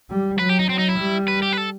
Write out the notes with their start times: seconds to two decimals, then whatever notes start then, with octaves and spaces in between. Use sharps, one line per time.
0.10 G3
0.39 F#3 B4
0.49 G4
0.59 D#4
0.69 F#3 C4
0.79 D#4
0.89 E4
0.98 G3
1.28 B4
1.43 G4
1.52 B4
1.57 A4